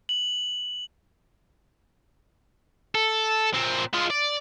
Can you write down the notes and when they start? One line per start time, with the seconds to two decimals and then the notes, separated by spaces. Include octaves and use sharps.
0.09 F#7
2.95 A4
3.54 A#2 C4
3.93 G#3 F4
4.10 D5